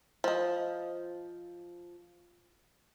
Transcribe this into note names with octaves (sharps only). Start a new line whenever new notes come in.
F3 D#5